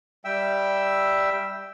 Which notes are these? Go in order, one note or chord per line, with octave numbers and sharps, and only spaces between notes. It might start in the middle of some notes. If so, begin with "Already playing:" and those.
G3 E5 G5 E6